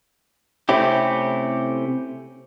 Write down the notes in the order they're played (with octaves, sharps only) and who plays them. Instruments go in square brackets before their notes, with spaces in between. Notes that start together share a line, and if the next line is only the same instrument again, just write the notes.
[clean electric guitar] C3 A3 C4 C#4 E4 G4